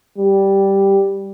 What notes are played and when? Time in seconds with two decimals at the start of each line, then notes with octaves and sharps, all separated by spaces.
0.18 G3